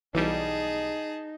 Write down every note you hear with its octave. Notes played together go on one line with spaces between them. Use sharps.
B1 E3 G3 D#4 G#4 A5